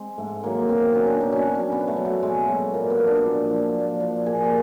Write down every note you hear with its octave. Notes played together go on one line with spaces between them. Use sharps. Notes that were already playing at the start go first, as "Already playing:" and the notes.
Already playing: G#3 C4
G#2 A3
D#3 F#3 A#3
B2 C4
C4
F#3 C#4
D4
B2 D#4
C#4 D4
F#3
C#4
B2 B3
A3
F#3
A3
B2 G#3
F#3 A3
A#2 A#3
B3
F3
D4
A#2
F3
A#2
F3
A#2 G#4
G4